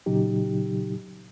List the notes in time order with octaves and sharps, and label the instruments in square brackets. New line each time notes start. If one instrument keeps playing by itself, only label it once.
[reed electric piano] A#2 C#3 F#3 D#4 G4